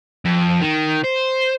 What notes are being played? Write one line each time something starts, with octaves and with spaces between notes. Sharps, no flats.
F2
D#3
C5